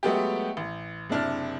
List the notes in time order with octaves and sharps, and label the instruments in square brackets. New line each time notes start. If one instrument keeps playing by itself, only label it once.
[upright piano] F#3 G#3 A3 B3 F#4 G4
A1
F#1 C3 D4 E4 F6